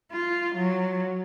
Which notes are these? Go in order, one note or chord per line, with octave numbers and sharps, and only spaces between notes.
F4
F#3